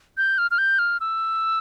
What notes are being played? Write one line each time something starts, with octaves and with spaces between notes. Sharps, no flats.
G6
F6
F6
G6
F6
E6